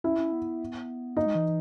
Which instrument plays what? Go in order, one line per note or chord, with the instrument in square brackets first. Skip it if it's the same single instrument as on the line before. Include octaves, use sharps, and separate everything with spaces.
[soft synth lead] C#4 [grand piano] E4 E5
[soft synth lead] C#4
B3
[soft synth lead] A#3 [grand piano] D#4 D#5
[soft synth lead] G#3
E3